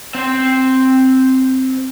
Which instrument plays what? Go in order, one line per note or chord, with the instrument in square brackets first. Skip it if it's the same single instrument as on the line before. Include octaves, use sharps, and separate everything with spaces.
[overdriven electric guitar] C4 C5